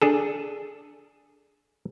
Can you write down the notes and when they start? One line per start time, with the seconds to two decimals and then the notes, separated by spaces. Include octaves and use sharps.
0.02 D4 G#4 A4